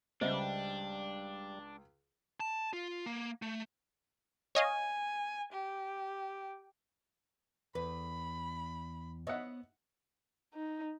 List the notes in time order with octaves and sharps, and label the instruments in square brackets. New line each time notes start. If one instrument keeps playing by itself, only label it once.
[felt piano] C#2 [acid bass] G3 [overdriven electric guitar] D4 [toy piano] C5 D#5 E5
[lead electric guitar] A5
F4
A#3
A3
[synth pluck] C#5 D#5 F5 [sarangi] G#5
[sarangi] G4
[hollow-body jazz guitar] E2 [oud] B4 [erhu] B5
[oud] B3 C#5 [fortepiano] D#5 E5 F#5
[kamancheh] D#4